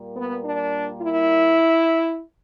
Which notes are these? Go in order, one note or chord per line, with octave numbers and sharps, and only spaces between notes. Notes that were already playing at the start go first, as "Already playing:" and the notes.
Already playing: A#2 G3 A#3
B3
D4
E4